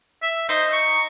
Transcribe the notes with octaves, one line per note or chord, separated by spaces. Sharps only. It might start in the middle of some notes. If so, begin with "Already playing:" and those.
E5
D#4 C5
C#6